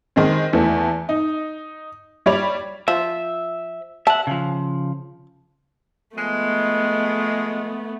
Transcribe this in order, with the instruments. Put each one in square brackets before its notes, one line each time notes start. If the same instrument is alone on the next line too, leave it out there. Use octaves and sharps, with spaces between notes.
[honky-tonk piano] D#3 G#3 C4
E2 E3 A3
D#4
G3 C#5 D5 B5 F7
[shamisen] F3 [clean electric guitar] E5
[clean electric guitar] E5 F#5 [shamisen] A5
[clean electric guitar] C#3 F3
[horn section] F3 G#3 [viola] A3 B3